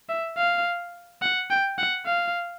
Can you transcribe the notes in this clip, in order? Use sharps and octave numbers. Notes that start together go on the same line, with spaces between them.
E5
F5
F#5
G5
F#5
F5